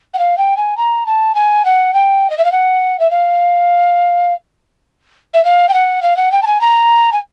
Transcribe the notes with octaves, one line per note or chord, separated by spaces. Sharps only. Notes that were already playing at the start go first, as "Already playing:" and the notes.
F#5
F5
G5
G#5
A#5
A5
G#5
F#5
G5
D#5
E5
F5
F#5
E5
F5
E5
F5
G5
F#5
F5
F#5
G5
A5
G#5
A#5
G#5